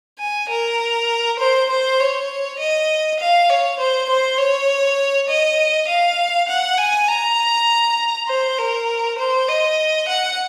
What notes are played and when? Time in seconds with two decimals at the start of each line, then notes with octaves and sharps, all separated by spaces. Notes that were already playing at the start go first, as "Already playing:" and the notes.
0.19 G#5
0.50 A#4
1.39 C5
1.69 C5
1.99 C#5
2.59 D#5
3.19 F5
3.49 C#5
3.79 C5
4.09 C5
4.38 C#5
5.29 D#5
5.88 F5
6.48 F#5
6.78 G#5
7.08 A#5
8.28 C5
8.58 A#4
9.18 C5
9.48 D#5
10.08 F#5